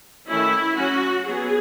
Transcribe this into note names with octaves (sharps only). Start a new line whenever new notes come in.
D#3 A3 C#4 E4
F#3 C#4 F#4
F#3 B3 G#4